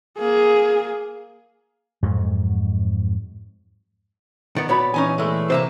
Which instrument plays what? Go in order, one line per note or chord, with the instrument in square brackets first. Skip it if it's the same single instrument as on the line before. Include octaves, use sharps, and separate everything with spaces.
[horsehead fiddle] A#3 G#4
[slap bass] F2 G#2 F#3
[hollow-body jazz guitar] D#3 B3 [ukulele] D5
[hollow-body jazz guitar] A#2 B3 [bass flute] F#4 [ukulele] C#5 D5 B5
[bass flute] E3 [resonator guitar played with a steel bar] C#4 D#4 G#5
[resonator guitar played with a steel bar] G#3 A3
[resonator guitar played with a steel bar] C3 A#3 [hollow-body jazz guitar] C5 E5 A#5